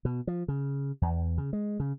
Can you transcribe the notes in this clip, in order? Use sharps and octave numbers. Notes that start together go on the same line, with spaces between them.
B2
F3
C#3
E2
C#3
G#3
C#3